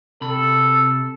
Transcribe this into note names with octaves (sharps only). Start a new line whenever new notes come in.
C3 A4 B5